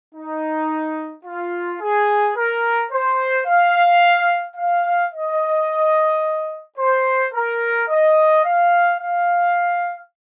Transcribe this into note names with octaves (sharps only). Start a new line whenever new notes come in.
D#4
F4
G#4
A#4
C5
F5
F5
D#5
C5
A#4
D#5
F5
F5